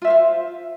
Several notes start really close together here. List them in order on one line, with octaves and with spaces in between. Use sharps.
F4 E5 C5 F5